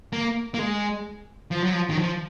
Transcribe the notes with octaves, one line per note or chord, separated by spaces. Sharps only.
A#3
A#3
G#3
F3
F#3
F3
D#3
F3